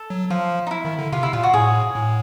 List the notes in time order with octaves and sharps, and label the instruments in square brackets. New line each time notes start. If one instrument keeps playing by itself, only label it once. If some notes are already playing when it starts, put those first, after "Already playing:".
Already playing: [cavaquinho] A4
[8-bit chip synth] F#3
[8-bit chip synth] F3 [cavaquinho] F4
[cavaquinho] D#4
E4
[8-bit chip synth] D#3
D3
[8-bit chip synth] C3 [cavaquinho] F4
[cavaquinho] E4
[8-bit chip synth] A#2 [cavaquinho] F4
[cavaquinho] F#4
[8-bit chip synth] A2 [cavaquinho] G#4
[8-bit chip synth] A2